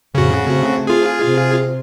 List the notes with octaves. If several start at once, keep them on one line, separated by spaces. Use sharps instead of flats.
F2 A2 C#3 F#4
A3 C4
F4 G#4
C3 C4